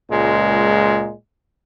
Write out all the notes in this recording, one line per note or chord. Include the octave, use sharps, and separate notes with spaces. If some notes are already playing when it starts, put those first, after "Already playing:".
C#2 A#2 G#3